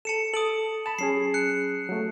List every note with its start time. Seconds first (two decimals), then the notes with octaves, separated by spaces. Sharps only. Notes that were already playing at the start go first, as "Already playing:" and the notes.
0.05 A4 A5 C#7 E7
0.34 A4 D#6 D7 F#7
0.86 A5 B5 E7
0.99 F#3 C#4 G#4 C7
1.34 F#6 C#7
1.89 F#3 A3